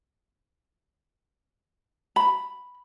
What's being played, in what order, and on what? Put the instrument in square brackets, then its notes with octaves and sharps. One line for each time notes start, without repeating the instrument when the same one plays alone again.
[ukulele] B5